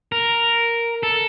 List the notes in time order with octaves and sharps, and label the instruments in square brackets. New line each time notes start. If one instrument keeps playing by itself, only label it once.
[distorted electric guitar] A#4
A4